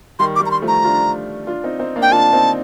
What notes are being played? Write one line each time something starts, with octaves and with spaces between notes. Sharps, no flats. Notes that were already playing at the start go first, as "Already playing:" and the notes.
D#3 G3 C6
D6
D#3 G3
A#5
C6
F3 A3
A#5
D4 F4
D4 F4
C4 D#4
C4 D#4
A#3 D4
G5
D4 F4 A5
C4 D#4